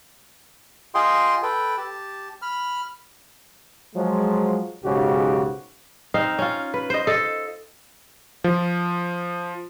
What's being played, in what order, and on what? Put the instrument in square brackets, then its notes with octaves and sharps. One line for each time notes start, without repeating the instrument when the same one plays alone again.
[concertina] F4 G#4 D#5 G5 C6
A4 B4 G5
G4 A5
B5 F6
[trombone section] F3 F#3 G#3
B1 G#2 C#3 F#4 G4
[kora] C4 D#4 F5
C#4 F4
B4
C5 D#5
A4 D#5
[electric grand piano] F3